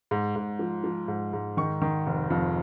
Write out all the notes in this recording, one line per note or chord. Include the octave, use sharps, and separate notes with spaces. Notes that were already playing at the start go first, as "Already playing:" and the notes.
G#2
G#2
F3
F3
G#2
G#2
D#3 C#6
D#3
F1
F2